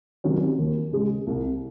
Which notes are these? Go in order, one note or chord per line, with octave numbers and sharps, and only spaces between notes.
C3 D#3 F#3 C#4
D#2
C#3 G#3
C2